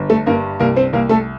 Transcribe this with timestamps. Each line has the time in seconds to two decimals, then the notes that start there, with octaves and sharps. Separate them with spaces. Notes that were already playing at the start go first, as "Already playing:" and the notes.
Already playing: G1
0.10 A3 A4
0.26 G2 A#3 A#4
0.60 C2 A#3 A#4
0.76 C4 C5
0.93 C2 A#3 A#4
1.09 A3 A4